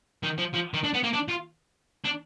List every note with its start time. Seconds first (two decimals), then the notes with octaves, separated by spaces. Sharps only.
0.23 D#3
0.38 F3
0.54 F3
0.74 D#3
0.84 D4
0.94 B3
1.04 A#3
1.14 D4
1.29 F4
2.05 D4